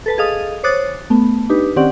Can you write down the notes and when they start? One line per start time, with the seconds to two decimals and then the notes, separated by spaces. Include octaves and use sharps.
0.06 A4 B4 A5
0.18 G#4 A4 D#5 F5 D#6
0.63 C5 C#5 D6 D#6 F#6 A6
1.10 A3 B3
1.49 D4 D#4 G4 B4
1.76 D#3 C4 C#4 G4 D5 F#5